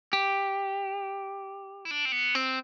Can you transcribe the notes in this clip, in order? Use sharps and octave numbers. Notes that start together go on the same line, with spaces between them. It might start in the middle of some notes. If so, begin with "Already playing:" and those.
G4
E4
D4
C4
B3
C4